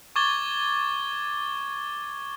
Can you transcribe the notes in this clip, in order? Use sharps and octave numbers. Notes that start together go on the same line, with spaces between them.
C#6 D6 G#6 A6 G7